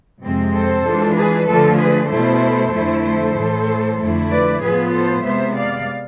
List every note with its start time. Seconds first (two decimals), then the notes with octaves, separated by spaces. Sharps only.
0.22 F2 C3 G#3 C4
0.53 A4 C5
0.85 E3 G#3 D4 F4
1.16 G#4 B4
1.48 D3 F3 A3 F4 A4
1.78 G#4 B4
2.10 B2 A3 E4 A4 C5
2.73 F2 D3 A3 E4
3.04 A4 C5
3.36 A2 E3 A3
3.99 F2 D3 A3 E4
4.30 B4 D5
4.61 A2 F3 B3 F4 G#4 B4
4.92 A4 C5
5.24 C3 G#3 B3 C5 E5
5.55 D5 F5